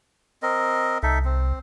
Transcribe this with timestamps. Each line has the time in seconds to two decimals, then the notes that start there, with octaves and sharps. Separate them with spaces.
0.42 C4 A#4 D#5
1.03 C2 D#4 A4 E5
1.25 C4